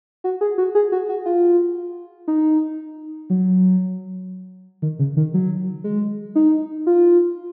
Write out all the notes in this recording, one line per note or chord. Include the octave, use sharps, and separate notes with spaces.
F#4
G#4
F#4
G#4
F#4
F#4
F4
D#4
F#3
D#3
C#3
D#3
F#3
G#3
D#4
F4